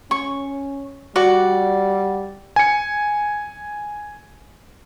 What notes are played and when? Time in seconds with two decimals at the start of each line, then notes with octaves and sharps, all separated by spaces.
0.11 C#4 C#6
1.16 G3 F#4 D5
2.56 G#5 C#7